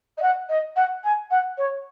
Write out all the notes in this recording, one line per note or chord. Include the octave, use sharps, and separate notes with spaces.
D#5
F#5
D#5
F#5
G#5
F#5
C#5